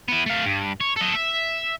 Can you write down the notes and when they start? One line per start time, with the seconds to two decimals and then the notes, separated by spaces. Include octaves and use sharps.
0.08 B3 E4
0.26 A3 F5
0.46 G2
0.80 C#5
0.96 A4 D#5
1.14 E5